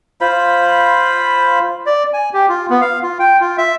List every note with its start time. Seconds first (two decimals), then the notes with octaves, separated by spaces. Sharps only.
0.21 F4 C5 B5
1.86 D5
2.13 G#5
2.33 G4
2.49 F4
2.70 B3
2.81 F5
3.03 F4
3.19 G5
3.40 F4
3.58 E5